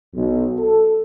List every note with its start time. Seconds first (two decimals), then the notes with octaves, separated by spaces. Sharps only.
0.15 B1
0.59 A4